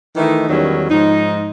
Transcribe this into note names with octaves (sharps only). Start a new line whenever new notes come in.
D#3 E3 A3 D#4
E2 D#3 F#3 G3 C#4
G#2 F3 D#4